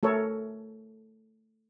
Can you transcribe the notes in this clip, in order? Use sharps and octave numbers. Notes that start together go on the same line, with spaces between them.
A3 A4 A#4 C#5